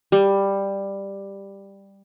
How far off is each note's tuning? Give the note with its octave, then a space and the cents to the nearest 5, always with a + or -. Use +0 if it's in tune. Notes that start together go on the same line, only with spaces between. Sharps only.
G3 +10